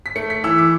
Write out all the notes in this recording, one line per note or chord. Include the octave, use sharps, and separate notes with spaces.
B6
A3 C#7
B6
E3 E6
D6